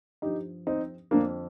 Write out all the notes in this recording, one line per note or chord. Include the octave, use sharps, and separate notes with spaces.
G2 F3 D#4 G4
C4 D#4
F2 D3 F3 A#3 D4